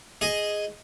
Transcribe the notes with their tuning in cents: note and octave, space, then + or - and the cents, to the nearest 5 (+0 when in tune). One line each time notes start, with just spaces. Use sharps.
G#4 +0 D#5 +0